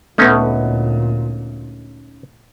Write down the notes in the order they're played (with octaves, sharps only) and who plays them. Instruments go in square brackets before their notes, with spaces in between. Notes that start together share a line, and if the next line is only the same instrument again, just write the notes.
[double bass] D2 A#2 [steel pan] A3 B3 [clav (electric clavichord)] C#4 D#4